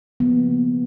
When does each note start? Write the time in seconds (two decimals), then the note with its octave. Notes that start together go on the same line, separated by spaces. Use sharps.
0.20 C#3 F3 A#3 B3